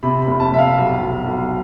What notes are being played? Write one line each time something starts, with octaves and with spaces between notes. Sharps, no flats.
C3 B5
B5
F1
A5
F1 E5
F5
B1
B1
B1